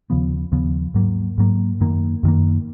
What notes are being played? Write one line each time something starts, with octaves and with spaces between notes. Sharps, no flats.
D#2 C#3 F3 B3
D#2 C#3 F3 B3
G#2 F#3 A#3
G#2 F#3 A#3
F#2 D#3 A#3
F#2 D#3 A#3